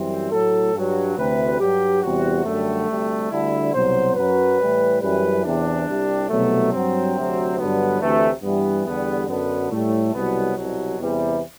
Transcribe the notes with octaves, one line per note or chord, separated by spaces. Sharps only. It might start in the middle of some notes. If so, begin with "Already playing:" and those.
Already playing: F#2 E3 G3 C4
A2 F#3 A4
G2 F#3
D2 C3 E3 B4
G2 F#3 G4
E2 C3 G3 F#4
F#2 D3 G3 A3
D2 C3 G3
D2 D3 G3 E4
C2 B2 F#3 C5
F#2 F#3 B4
A2 E3 G3
F#2 E3 G3 B4
E2 C3 E3 D4
C2 C3 G3
C2 B2 F#3 A3
G2 F#3 C4
D2 C3 F#3
G2 D3 F#3 B3
D2 C3 E3 A3
G2 E3 G3 B3
E2 D3 G3 B3
F#2 D3 F#3 B3
A2 G3 A3
C2 B2 F#3 B3
C2 B2 F#3
E2 C3 E3 G3